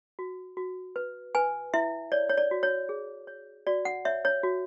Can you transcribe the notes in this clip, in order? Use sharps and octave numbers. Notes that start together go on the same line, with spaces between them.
F#4
F#4
B4
B4 G#5
E4 E5
C#5 D5
C#5
D5
F#4
C#5
G#4
C#5
F#4 D5
F#5
C#5 E5
C#5
F#4